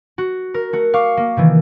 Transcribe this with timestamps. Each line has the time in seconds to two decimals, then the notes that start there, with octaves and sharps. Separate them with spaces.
0.18 F#4
0.54 A#4
0.73 A3 F#4
0.94 F5 C#6 D6
1.17 A#3
1.36 C3 D#3 E3